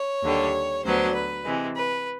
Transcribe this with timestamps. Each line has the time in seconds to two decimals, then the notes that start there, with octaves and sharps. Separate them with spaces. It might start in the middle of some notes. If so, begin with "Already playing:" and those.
Already playing: C#5
0.22 D#2 D3 G3
0.84 D2 D3 F#3 B3 C5
1.14 B4
1.45 C3 E3 G#3
1.75 B4